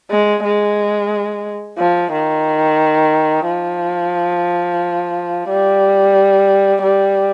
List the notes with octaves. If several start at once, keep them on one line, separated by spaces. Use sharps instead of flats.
G#3
G#3
F3
D#3
F3
G3
G3